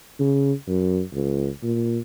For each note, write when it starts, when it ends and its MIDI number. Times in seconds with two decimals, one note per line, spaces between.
0.19 0.52 49
0.68 1.01 42
1.13 1.48 37
1.63 1.99 46